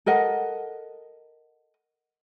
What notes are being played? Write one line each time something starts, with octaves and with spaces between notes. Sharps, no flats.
A4 A#4 D#5 F#5